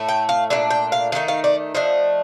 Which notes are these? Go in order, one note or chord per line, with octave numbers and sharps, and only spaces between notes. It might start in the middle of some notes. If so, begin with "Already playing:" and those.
Already playing: A2 A3
G5
F5
A#2 A3 D4
G5
F5
D#3 A3 D#4 F5
F5
D5
F3 A3 D4 D#5